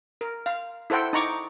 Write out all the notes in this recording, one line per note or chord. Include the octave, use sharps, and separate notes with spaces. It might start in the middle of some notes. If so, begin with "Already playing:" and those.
A#4
F5
E4 A4 C5 F#5 G5
D#4 A#5 C#6 D6